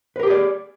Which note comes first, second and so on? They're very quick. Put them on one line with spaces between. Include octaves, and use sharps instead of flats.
B4 A#4 G4 G#4 D5